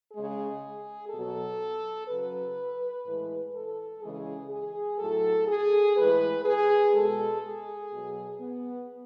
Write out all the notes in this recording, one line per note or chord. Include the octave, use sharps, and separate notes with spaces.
C#3 G#3 G#4
B2 F#3 A4
C#3 F#3 B4
A2 E3 G#3
A4
C#3 E3 G#3 G#4
G#4
A2 F#3 A4
G#4
A2 E3 G#3 B4
G#4
B2 G#3 A4
G#4
B2 F#3
B3